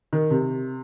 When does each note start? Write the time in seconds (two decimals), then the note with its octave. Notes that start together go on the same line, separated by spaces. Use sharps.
0.13 D#3
0.30 C3